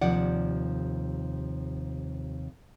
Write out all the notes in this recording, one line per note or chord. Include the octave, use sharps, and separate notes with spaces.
D#2 C3 F3 D5 F#5